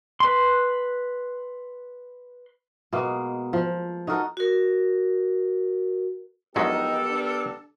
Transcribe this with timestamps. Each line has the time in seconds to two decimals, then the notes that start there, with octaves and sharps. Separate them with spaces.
0.20 B4 C6
2.93 B2 G#3 A#3
3.53 F3
4.07 D#4 F#4 A4 A#4
4.37 F#4 A#4
6.56 A#1 F#3 G#3 B3 D#4 G4 A4 A#4
7.10 D4